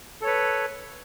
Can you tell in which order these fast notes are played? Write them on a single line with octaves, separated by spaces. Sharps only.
A4 C#5 B4